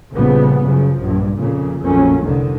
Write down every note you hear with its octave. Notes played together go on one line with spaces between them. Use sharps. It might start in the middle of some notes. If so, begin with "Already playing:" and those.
A#1 C#3 F3 G3 B3
F#2 C#3 F3
A#1 G2
F2 A#2 C#3
A#1 F2 F#3 A#3 C#4
F1 C2 F2 D3 D#3